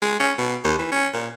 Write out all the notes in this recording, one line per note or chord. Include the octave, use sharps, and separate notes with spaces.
G#3
C#4
B2
D#2
E3
C#4
A#2